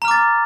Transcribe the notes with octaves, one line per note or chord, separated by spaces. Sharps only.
A#5 D6 F6 A6